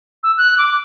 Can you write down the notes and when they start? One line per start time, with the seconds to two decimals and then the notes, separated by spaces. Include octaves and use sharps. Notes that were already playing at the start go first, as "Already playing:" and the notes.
0.23 E6
0.37 F#6
0.58 D6